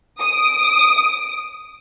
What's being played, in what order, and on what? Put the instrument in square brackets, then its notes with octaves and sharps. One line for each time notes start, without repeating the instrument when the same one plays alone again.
[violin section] D#6 D7